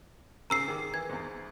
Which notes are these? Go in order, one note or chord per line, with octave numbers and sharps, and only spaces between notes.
G#2 C#3 A#4 A#5 E6 C7
D#3 G#4 D6
E3 G#6
E2 G#2